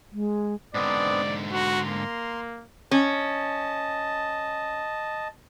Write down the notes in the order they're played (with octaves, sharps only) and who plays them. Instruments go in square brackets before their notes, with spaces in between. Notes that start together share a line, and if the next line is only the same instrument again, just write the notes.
[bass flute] G#3
[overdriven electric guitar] G#2 D3 [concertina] B3 C4 D4 [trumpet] D5
[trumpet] F#4 [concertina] A#5 C6
[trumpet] A#3
[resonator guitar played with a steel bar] C#4 [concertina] D#5 A5